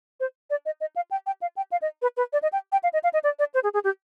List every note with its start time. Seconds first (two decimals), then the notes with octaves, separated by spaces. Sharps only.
0.20 C5
0.50 D5
0.66 D#5
0.81 D#5
0.96 F5
1.11 G5
1.27 G5
1.42 F5
1.57 G5
1.72 F5
1.82 D#5
2.02 B4
2.17 B4
2.33 D5
2.42 D#5
2.53 G5
2.72 G5
2.83 F5
2.93 D#5
3.04 F5
3.13 D#5
3.24 D5
3.39 D5
3.54 C5
3.63 G#4
3.74 G#4
3.84 G4